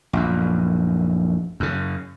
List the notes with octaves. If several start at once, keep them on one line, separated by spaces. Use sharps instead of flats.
A#1 F#2
F#2 C#3